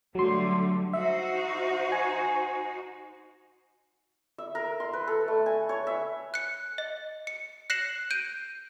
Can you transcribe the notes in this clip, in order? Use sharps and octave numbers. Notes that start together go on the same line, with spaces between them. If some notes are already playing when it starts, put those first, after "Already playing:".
D3 F#3 G3 A3 C6
D#4 F#4 C5 E5
G#5
E5
A#4
C6
B4
A4
A3
G#5
C#5
E5
F#6 C#7
D#5
C#7
F#6 A#6 C7 C#7 E7 F#7
G6 D7 D#7